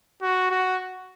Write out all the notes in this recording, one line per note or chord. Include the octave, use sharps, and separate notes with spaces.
F#4
F#4